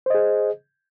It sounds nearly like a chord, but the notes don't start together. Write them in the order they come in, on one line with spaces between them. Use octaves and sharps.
C5 D#5 G#4